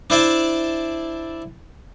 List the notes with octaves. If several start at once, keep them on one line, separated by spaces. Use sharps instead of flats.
D4 E4 C5 D5 E5 A5